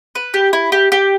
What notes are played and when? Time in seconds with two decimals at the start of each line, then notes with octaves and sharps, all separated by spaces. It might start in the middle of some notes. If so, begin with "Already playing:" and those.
0.15 B4
0.34 G4
0.53 E4
0.72 G4
0.92 G4